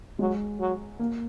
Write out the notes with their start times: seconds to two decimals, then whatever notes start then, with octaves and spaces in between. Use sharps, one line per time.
0.19 F#3 G#3
0.60 F#3
0.99 A#3